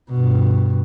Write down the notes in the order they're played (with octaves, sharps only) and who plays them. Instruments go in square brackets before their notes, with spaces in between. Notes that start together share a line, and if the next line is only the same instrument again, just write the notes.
[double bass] G2 B2